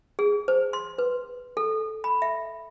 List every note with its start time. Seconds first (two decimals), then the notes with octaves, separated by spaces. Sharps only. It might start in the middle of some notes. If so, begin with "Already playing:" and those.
0.19 G#4
0.48 C5
0.73 C6
0.98 B4
1.57 A4
2.04 B5
2.22 E5